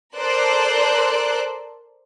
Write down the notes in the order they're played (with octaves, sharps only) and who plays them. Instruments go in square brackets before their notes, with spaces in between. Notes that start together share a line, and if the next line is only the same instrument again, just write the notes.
[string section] A4 A#4 C5 D5 F#6